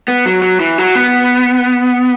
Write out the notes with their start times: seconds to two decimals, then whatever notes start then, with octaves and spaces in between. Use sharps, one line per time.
0.08 B3
0.26 F#3
0.42 F#3
0.60 E3
0.78 F#3
0.95 B3